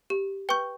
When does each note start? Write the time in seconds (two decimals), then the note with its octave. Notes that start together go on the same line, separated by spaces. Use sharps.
0.10 G4
0.49 B4 G5 C#6 G6